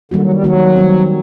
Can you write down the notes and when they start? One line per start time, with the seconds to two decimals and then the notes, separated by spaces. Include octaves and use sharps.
0.11 D3 D#3 G3 A#3 F#4
0.22 F#3
0.33 G3
0.44 D#3 F#3 G3 A#3 F#4
0.76 D#3 G3 C4